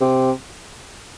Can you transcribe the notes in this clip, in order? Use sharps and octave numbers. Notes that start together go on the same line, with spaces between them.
C3